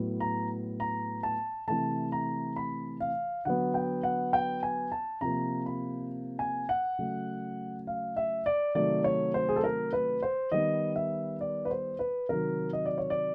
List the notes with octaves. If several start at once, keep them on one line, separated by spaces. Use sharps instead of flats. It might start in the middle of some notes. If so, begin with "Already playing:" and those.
Already playing: A2 F#3 B3
A#5
A#5
A5
C3 E3 A3 A5
A#5
B5
F5
D3 F#3 B3 F#5
G5
F#5
G5
G#5
A5
C3 F3 A#3 A#5
B5
G#5
F#5
C#3 F#3 A3
F5
E5
D5
C3 D#3 F#3 A3 D5
C#5
C5
G#4
A4
A#4
B4
C5
D#3 G3 B3 D#5
E5
D5
B4
C5
B4
C3 D#3 F#3 A#4
D#5
D5
C#5
D5